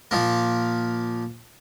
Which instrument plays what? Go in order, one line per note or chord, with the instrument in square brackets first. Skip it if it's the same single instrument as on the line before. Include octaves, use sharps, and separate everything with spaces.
[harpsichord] A#2 F3 A#3